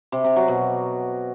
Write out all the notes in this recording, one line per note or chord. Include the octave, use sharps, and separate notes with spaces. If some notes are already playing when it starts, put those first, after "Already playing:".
C3
C3
F#3
B2